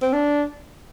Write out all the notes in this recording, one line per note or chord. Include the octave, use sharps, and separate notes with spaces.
C4
D4